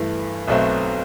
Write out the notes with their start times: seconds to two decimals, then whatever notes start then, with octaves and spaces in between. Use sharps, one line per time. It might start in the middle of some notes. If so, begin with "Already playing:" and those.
Already playing: G2 E3 A3
0.48 B1 B2 F#3 A3 C4